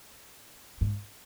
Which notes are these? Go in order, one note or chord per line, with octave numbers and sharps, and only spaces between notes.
G#2